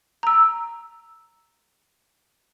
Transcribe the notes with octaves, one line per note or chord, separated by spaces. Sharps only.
A#5 E6